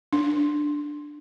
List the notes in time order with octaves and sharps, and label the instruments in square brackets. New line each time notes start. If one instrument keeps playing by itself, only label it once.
[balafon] D4